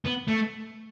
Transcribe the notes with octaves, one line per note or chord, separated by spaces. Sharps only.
B3
A3